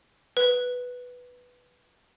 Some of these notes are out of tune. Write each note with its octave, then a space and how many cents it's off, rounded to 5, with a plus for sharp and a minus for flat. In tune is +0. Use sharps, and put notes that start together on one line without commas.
B4 +0